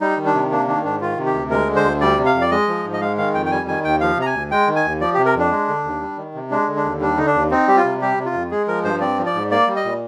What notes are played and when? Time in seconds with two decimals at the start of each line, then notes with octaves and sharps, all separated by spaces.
0.01 G3 D#4
0.18 D#3
0.26 D4
0.34 C3
0.51 A#3 D4
0.67 D#3 D4
0.84 G#2 D4
1.01 D#3 F4
1.17 C3
1.26 G4
1.34 D2
1.51 G#3 A#4
1.67 D3
1.76 C5
1.84 D2
2.01 G3 D5
2.18 C3
2.25 F5
2.34 F2
2.41 D5
2.51 G#3 D#5
2.68 F3
2.84 G#2
2.93 D#5
3.01 G#3 F5
3.18 D#3 F5
3.34 F2 G5
3.46 G5
3.51 G3 G#5
3.68 D#3 G#5
3.84 D#2 G5
4.01 F3 F5
4.17 C3 A#5
4.26 G#5
4.34 D2
4.51 G#3 G5
4.67 D#3
4.76 G#5
4.84 D#2
5.01 F3 D5
5.14 G4
5.18 C3
5.26 A#4
5.35 F2 D4
5.51 G#3
5.68 D3
5.84 D#2
6.01 G3
6.17 D#3
6.34 C3
6.51 G#3 D4
6.68 D3
6.76 D4
6.84 D#2
7.00 G3 D4
7.17 D3 D#4
7.26 D4
7.34 D#2
7.51 C4 D#4
7.68 G3 G4
7.77 F4
7.84 C3
8.01 G3 G4
8.18 C3
8.26 F4
8.34 F2
8.51 G#3 G#4
8.68 F3 A#4
8.84 G2 C5
9.01 C4 D5
9.18 F3
9.26 D5
9.34 G#2
9.51 A#3 D5
9.68 G3
9.76 D#5
9.85 A#2